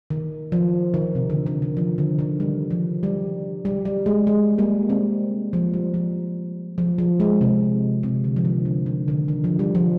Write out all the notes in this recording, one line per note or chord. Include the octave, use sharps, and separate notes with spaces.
D#3
F3
D#3
C3
D3
D#3
D#3
F3
D3
D#3
G3
F3
G3
G3
G3
G#3
G#3
G3 A#3
G#3 C4
F3
G3
F3
F3
F3
G#3
C3
C3
D3
F3
D#3
D3
D#3
D3
D#3
F3
G3
F3